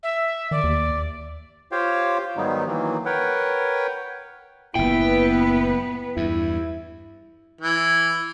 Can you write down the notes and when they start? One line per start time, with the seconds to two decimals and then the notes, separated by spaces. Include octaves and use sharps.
0.03 E5
0.51 D#3 D5
0.64 D#2
1.72 F4 G4 C5 C#5 F5 G5
2.37 G#2 D#3 F#3 G3 B3 D#4
2.67 D#3 E3 F#3 A#3
3.06 A#4 B4 C#5 F#5 G5
4.75 F#1 A#2 B3 E4 B4 G5
6.17 E2 G2 E4
7.61 E3